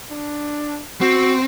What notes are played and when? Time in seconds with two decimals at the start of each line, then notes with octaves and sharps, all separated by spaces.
0.12 D4
1.01 C4 F#4